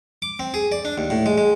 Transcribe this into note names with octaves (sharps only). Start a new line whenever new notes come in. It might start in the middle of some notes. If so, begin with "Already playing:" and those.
D6
C4
G#4
D5
D4
D#2
A2
G#3
G#3